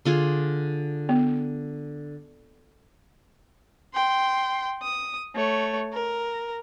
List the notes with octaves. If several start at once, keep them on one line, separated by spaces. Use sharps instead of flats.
D3 F4 G#4
B3
G5 C6
D#6
A3 C#5
A#4